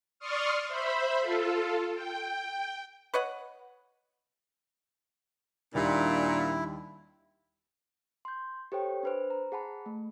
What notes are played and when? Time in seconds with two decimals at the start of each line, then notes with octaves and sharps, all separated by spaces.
0.19 D5 C6 C#6 D#6 F6
0.68 C5 E5 B5
1.21 F4 A4
1.94 G5
3.14 B4 C#5 D#5 F#5
5.75 D#2 A#2 G3 D4 E4
8.25 C6 G6
8.72 G4 A4 C5 C#5 G5
9.03 D4 B4 C5
9.30 A#5
9.52 G#4 F#5 A5 B5
9.86 A3